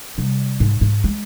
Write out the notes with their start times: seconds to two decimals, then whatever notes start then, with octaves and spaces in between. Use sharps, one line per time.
0.18 C3 G3
0.60 G#2
0.81 G#2
1.04 G#3